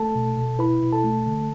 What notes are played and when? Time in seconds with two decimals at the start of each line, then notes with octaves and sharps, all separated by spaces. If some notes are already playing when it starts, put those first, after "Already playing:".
Already playing: A3 A4 A5
0.15 B2
0.38 B2
0.59 E4 B4 B5
0.82 B2
0.93 A4 A5
1.04 A3
1.27 D3